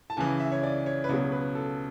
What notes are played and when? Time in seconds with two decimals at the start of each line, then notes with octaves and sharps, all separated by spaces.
0.10 A5
0.17 C#2 C#3 E3 G#5
0.40 E5
0.52 C#5
0.63 D5
0.86 C#5
1.04 B4
1.09 C#2 B2 F#3 C#5
1.32 B4
1.55 A4